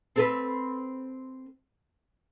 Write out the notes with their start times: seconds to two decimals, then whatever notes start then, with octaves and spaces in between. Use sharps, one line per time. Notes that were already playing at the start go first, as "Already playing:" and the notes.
0.16 C4 A4 B4